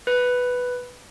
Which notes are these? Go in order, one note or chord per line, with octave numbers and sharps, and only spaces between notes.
B4